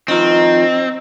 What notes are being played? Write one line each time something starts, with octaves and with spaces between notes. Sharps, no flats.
D#3 F3 C4 D#5 A#5